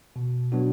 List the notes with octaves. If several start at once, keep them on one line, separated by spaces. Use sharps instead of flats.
B2
F#3 B3 D4 F#4